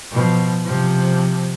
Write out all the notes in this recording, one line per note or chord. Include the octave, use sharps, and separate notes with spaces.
B2 F3
C3 F3